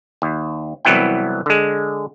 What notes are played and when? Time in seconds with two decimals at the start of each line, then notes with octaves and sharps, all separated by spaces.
0.22 D#2
0.85 C2 E3 F#3 B3 E4 G5
1.46 D3 G#3